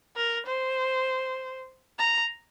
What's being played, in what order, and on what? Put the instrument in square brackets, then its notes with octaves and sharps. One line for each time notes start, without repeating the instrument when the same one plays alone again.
[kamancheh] A#4
C5
A#5